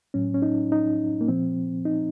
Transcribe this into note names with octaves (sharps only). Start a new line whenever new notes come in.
A2 F#3 C#4
C#4
D#4
D#4
A#3
A#2 F3 C4
D#4